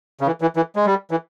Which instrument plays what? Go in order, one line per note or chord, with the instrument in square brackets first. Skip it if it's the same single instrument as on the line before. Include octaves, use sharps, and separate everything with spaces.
[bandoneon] C#3
E3
E3
E3
G#3
G3
E3